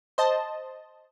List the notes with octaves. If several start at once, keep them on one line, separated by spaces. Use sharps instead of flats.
C5 D#5 A5